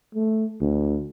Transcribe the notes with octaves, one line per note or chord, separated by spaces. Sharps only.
A3
D2